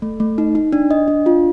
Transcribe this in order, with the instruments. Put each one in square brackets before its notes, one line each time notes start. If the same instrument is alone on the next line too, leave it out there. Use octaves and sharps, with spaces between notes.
[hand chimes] A3
A3
D#4
D#4
D4
D#5
D4
F4